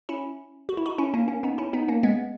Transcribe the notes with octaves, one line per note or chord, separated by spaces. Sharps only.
C#4 E4
F#4
E4
D#4 F#4
C#4 E4
A#3 C#4
A#3 C#4
B3 D#4
C#4 E4
B3 D#4
A#3 C#4
G#3 B3